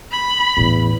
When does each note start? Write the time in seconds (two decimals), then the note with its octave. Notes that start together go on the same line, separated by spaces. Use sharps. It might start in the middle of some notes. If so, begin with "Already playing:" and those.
0.11 B5
0.57 E2 A2 C#3